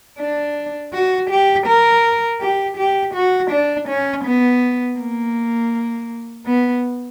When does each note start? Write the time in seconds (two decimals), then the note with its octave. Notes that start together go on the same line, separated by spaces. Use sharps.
0.19 D4
0.93 F#4
1.30 G4
1.67 A#4
2.41 G4
2.77 G4
3.15 F#4
3.51 D4
3.88 C#4
4.25 B3
4.99 A#3
6.46 B3